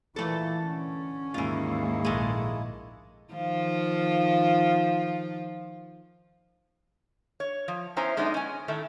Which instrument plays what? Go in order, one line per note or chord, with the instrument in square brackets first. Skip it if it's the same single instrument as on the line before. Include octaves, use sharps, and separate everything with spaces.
[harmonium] A#2 A#3 E4 [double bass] E3 [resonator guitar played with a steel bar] A3 A4
[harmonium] D3 [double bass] C#4
[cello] D#2 G#2 [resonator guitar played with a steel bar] E3 F4 [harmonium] A#3 E4 D#5
[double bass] A#1 [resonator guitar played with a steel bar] G#3 A3
[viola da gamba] D#3 F3 F4
[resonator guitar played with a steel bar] C#5
F3
B3 C#4 E4 C5 G#5 A#5
F#2 G#3 A3 B3 D4 D#4
C#4 G#5
A2 D#3 A3 E5